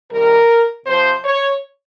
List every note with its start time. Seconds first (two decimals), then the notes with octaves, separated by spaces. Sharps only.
0.10 C3 D#3 G3 A#4
0.85 C3 F3 C5
1.23 C#5